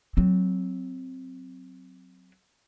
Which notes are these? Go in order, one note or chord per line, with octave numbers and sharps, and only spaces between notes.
F#3 C4